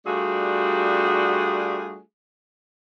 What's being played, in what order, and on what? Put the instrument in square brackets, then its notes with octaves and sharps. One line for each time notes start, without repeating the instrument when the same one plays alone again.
[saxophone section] G3 A3 D4 F4 F#4 G#4